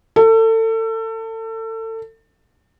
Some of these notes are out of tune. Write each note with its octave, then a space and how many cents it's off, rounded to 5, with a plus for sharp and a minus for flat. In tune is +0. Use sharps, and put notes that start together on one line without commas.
A4 +30